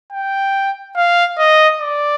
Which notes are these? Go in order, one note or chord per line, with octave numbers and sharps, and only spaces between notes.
G5
F5
D#5
D5